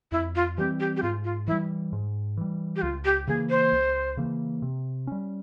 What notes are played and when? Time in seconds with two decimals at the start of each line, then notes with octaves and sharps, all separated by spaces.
0.12 F2 E4
0.35 F4
0.57 E3 G3 C4 G4
0.80 G4
0.97 G4
1.02 G#2 F4
1.24 F4
1.47 E3 G3 E4
1.93 G#2
2.37 E3 G3
2.76 G4
2.82 C#2 F4
3.05 G4
3.27 C#3 E3 A#3 G#4
3.50 C5
3.72 C#2
4.17 C#3 E3 A#3
4.62 C3
5.07 G3 C#4